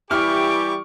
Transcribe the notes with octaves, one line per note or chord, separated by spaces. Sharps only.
E3 G3 E4 G4 C#6 D6 F6